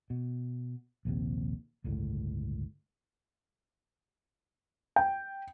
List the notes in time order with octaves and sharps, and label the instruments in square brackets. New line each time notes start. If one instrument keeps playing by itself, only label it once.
[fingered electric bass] B2
A#1 D#2 C3
G1 C#2 A2
[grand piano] G5